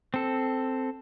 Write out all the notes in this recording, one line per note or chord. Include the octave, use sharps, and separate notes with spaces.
C4 A4